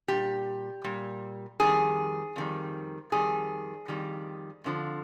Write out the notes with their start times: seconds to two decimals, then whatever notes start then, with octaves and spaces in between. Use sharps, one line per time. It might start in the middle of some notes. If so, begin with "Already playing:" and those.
0.08 A#2 G3 G4
0.84 A#2 G3
1.60 F2 D#3 G3 G#4
2.36 F2 D#3 G3
3.12 F2 D#3 G3 G#4
3.88 F2 D#3 G3
4.64 F2 D3 F3